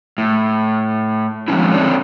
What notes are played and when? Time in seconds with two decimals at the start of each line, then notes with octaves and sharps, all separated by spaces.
0.18 A2
1.48 F3 F#3 G#3 C4 C#4 E4
1.73 C4 D4 A4 C#5 D5